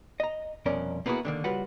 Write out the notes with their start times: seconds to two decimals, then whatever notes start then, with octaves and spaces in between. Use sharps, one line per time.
0.20 D#5 A#5
0.66 C2 F2 B2 C#4 A#4 D5
1.06 A#3 B3 D#4 E4 F#4 G#4
1.25 D3 D#3 A#3
1.44 C#3 G3 F4 F#4 B4 F#5